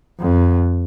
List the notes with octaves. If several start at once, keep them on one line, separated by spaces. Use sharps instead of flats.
F2